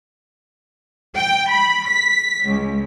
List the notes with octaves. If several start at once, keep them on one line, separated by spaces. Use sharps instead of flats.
G5
B5
B6
C#2